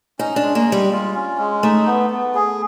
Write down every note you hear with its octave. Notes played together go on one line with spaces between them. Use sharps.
C#4 D#4
D4
G#3
A#3
G#3
G3
F4
C#4
G#3
A3 D#4
B3
B3
G#4